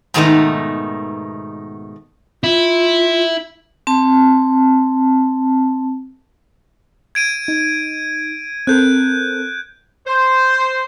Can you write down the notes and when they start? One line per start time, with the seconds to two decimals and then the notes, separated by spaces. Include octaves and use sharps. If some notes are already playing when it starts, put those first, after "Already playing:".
0.14 G#2 B2 D#3 A3 B3 D#4
2.44 E4 F4
3.87 C4 A5
7.15 G#6 D7 D#7
7.48 D#4
8.67 C4 A4 A#4 F#6 G6
10.07 C5